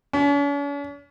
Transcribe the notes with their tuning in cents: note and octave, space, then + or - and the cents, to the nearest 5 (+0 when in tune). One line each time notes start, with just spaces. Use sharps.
C#4 +45